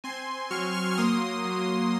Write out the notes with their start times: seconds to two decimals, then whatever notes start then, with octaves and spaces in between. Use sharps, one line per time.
0.04 C4 G#5 C6
0.51 F#3 C#6 F6
0.74 C#6 F6
0.92 F6
0.98 A#3 C6 D#6
1.45 F#3